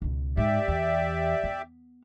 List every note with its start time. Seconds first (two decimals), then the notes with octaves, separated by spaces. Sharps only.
0.02 C#2 B2
0.37 G#2 G4 D5 E5
0.68 E2
1.43 B3